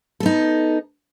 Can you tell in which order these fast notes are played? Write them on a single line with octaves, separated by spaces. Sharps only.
A4 B3 D#4